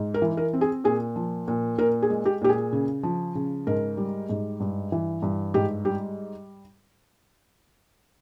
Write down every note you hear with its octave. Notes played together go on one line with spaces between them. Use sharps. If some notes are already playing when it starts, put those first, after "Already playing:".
Already playing: G#2
A#4
E3
A#4
C4
G#4
A#2 G#4
F3
A#2
A#2 A#4
G#4
G#3
G4
A#2 G4
G#4
C#3
F3
C#3
G#2 A#4
G3
G#2
G2
E3
G2
G#2 G4
G3 G4